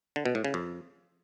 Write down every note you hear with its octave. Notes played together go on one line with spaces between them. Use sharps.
D3
B2
A2
C#3
F2